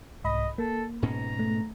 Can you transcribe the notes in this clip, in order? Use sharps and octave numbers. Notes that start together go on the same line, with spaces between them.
C2 G#2 D#5 B5
A#3 A4
G#2 B2 C#4 A#5
A3